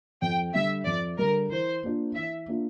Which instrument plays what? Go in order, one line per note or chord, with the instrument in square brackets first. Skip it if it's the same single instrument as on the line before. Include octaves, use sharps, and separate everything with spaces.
[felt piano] F2 [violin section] G5
[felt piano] D3 G3 [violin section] E5
[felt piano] F2 [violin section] D5
[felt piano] D3 G3 [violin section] A#4
[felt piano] E3 [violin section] C5
[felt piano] A#3 D4 F4
[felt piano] E3 [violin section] E5
[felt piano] A#3 D4 F4